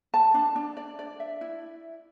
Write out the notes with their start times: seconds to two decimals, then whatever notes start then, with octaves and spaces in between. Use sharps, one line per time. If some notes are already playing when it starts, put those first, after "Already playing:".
0.14 A5
0.34 D4
0.56 D4
0.77 D5
0.99 D5
1.20 E5
1.41 E4